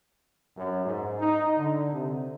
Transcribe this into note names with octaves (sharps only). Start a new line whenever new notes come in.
F#2
G#2
D#4
D3
C3